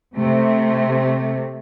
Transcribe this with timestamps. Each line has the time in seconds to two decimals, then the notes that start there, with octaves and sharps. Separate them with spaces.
0.15 C3 A3